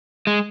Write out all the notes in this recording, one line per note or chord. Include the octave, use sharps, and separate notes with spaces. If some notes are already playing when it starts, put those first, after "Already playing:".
G#3